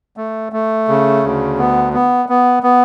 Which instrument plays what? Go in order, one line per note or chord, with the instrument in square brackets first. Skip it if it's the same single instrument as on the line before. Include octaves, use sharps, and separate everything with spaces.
[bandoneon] A3
A3
C#3
D2
B3
B3
B3
B3